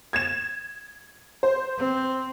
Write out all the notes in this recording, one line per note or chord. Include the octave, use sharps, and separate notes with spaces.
G#6 A6 E7
C5
C4